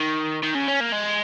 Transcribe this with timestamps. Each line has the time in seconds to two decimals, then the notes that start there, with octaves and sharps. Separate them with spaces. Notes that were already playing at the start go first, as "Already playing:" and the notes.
Already playing: D#3
0.43 D#3
0.55 C#3
0.68 C#4
0.81 A#3
0.92 G#3